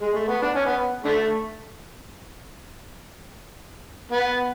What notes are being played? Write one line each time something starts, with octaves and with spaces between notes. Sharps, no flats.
G#3
A3
B3
D4
C#4
B3
D3 A3
B3